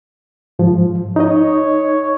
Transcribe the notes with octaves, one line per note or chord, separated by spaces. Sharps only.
G#2 F3
D#4 C#5 D#5